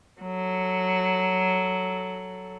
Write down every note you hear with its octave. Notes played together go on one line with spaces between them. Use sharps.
F#3 A4